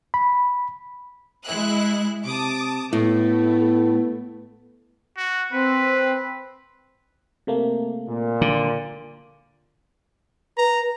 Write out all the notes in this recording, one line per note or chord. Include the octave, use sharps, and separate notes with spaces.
B5
G#3 E4 F#6
C3 A5 D6 D#6
A2 A3 B3 E4
F#4
C4 B4
C3 A3 A#3
A#2
D3
B4 A#5